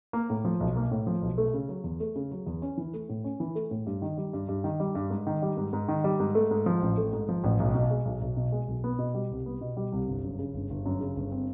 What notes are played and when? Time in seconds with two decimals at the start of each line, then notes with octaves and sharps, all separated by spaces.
0.13 A#3
0.30 A2
0.45 F3
0.60 B1
0.76 A#3
0.91 A2
1.07 F3
1.22 B1
1.38 A3
1.54 C#3
1.69 F#3
1.84 E2
2.00 A3
2.16 C#3
2.31 F#3
2.47 E2
2.62 C#4
2.78 E3
2.93 A3
3.09 A2
3.24 C#4
3.40 E3
3.55 A3
3.71 A2
3.86 G2
4.02 D#3
4.17 G3
4.33 G2
4.49 G2
4.64 D#3
4.80 G3
4.95 G2
5.10 G#2
5.27 D#3
5.42 G3
5.57 G#2
5.73 G#2
5.88 D#3
6.04 G3
6.20 G#2
6.35 A3
6.51 G#2
6.66 F3
6.82 A1
6.97 A3
7.13 G#2
7.29 F3
7.44 A1
7.60 B1
7.75 B2
7.91 G#3
8.05 B1
8.21 B1
8.37 B2
8.52 G#3
8.68 B1
8.84 B3
8.99 B2
9.14 G3
9.31 C2
9.46 B3
9.61 B2
9.77 G3
9.92 C2
10.08 G1
10.23 F#2
10.39 C#3
10.54 G1
10.70 G1
10.86 F#2
11.00 C#3
11.16 G1
11.32 C4